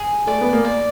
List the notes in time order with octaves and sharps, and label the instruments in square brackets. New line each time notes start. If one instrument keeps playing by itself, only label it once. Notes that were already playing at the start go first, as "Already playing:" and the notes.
Already playing: [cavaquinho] G#4
[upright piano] A3 [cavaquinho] D5
[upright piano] B3
A#3
[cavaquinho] D5